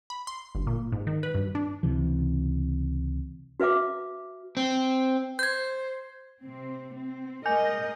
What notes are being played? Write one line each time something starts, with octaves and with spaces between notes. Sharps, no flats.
B5
C6
G1
A#2
G#2
D#3
B4
G2
D4
C#2 C3 E3
F#4 B4 E5 F5 D6
C4
C5 G6 G#6
C3 C4
C4
G#3 A#4 D#5 G#5 G6